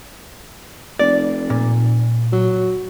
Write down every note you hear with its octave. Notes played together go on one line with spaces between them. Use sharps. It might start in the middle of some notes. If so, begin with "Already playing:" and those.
F1 D5
A#2
F#3